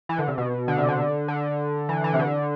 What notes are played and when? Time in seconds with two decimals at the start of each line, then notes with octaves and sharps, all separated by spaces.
0.09 E3
0.19 D3
0.28 C3
0.38 B2
0.68 D3
0.78 C3
0.89 D3
1.28 D3
1.89 E3
2.04 E3
2.14 C3
2.19 D3